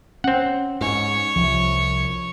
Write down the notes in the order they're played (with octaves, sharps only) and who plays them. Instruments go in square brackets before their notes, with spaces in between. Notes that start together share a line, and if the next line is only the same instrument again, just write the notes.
[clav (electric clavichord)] C4 F#5 [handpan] C#4
[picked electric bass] G#2 [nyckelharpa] C#5
[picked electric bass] C2 [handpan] F3